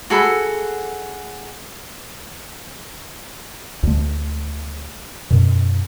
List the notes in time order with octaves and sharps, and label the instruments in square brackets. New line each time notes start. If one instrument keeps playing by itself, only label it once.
[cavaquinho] F#4 G#4 A4 B5
[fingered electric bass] D2 A3
F#2 B2